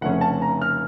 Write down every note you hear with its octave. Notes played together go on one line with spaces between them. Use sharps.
F1 F2 C#3 A3 C#4 F#5
A5
A#5
F6